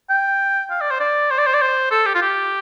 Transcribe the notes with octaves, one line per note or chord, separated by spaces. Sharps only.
G5
F5
D5
C5
D5
C5
D5
C5
D5
C5
A4
G4
F4
G4